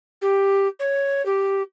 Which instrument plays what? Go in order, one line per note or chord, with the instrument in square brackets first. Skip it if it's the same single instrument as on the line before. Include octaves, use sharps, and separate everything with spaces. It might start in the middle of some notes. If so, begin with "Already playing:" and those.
[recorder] G4
C#5
G4